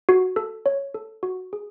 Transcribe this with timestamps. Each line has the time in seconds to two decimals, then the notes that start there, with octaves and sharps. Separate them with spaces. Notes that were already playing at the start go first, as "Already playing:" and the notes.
0.09 F#4
0.36 A4
0.66 C#5
0.94 A4
1.23 F#4
1.53 G#4